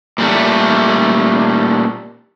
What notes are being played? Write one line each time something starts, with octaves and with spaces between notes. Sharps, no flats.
A#2 G3 A3